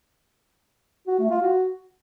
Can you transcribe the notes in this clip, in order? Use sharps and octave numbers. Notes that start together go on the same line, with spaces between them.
F#4
A3
F4
F#4